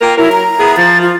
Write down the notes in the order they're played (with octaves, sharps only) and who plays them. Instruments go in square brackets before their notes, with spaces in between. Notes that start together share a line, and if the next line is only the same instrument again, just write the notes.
[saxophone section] A#3 F4 A#4 [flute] G5
[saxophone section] F#3 A#4 [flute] E4
[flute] A#5
[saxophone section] B3 E4 G#4
[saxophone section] F3 [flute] A6
[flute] F4